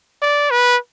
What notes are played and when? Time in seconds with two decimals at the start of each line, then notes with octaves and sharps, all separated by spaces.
0.22 D5
0.51 B4